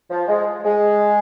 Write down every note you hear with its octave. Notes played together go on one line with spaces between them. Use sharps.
F3
G#3
G#3